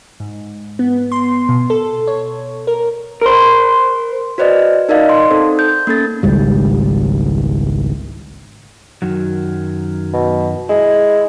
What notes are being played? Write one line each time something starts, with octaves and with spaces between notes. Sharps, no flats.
G#2
B3
C6
B2
A4
C#5
A#4
A#4 C5
F#4 B4 C5 D5 D#5
D#4 A#4 D5 D#5 F5
C6
C4 D#4 A4 C5
G6
A#3 C#4 A4 A6
G#1 C#2 G#2 G3
F#2 D#3 F#3
B2
G#3 E4